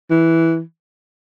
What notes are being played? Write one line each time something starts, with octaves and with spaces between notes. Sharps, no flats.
E3